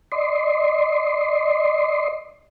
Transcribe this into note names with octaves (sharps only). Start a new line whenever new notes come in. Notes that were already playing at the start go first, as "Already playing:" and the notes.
D5 D#5 C6